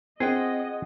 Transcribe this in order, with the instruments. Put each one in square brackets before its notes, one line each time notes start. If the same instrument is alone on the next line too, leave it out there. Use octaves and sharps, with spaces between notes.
[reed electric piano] C4 [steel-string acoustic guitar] F4 F#5 G5 [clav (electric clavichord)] G#4 [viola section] D#5